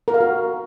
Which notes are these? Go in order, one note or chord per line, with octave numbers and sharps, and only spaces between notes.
A#4
F5
F#4